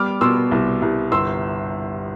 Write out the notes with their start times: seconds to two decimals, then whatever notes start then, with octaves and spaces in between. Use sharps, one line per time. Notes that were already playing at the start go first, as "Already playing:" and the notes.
Already playing: G3 B3 D6 F6
0.21 B2 C6 E6
0.51 C2
0.82 C2
1.12 G1 C6 E6